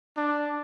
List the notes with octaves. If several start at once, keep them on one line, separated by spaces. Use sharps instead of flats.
D4